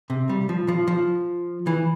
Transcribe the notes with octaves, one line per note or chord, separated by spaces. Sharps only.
C3
G3
F3
F3
F3
E3